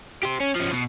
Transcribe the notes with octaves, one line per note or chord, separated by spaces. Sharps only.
G4 C5
C#4
F3 C#4
B2